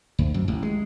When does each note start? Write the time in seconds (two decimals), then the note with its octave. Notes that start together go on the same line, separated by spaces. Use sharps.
0.19 D2
0.34 F#2
0.48 A1
0.63 G#3